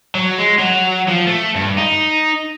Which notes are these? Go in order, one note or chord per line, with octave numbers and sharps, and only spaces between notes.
F#3
G#3
F#3
F3
A3
G2
D#4